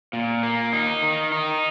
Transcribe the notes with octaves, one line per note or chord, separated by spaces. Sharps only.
A#2
A#3
D#4
D#3
D#4